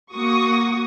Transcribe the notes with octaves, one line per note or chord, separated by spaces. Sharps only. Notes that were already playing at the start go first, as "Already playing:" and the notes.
A#3 F#4 C#6 D#6